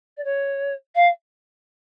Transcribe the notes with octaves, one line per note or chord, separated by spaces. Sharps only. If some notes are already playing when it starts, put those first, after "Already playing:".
D5
C#5
F5